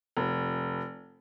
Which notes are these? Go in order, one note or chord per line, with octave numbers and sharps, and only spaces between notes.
F1